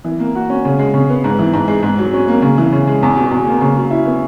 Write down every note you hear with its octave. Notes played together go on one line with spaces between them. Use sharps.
E3
A#3
F#4
C#4
C#3
G#3
C#3
B3
G#2
E3
G#2
G#3
G#2
F#3
C#4
A#3
C#3
E3
C#3
G#3
E2
B2
E2
A#3
C#3
F#3
E4
B3